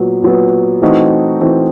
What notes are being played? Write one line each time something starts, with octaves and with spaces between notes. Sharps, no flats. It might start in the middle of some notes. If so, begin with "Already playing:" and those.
Already playing: A#2 F#3 B3
A#2 F#3 B3
E3 A3 C4 D#4 F#4
E3 A3 C4 D#4 F#4